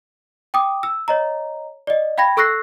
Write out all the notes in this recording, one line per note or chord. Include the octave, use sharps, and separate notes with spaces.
G5 D6 D#6
E6
C#5 D#5 A#5
D5 D#5
F5 G5 B5 G#6 A#6
A4 C#6 E6 F#6 A#6 C7